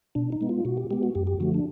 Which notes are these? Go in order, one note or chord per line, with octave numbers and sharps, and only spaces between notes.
B2 D4
D#4
G#3 B3
F4
B2 F#4
G4
G#3 B3 G4
F#4
F#2 G4
G4
D3 F3 A3 F#4
D4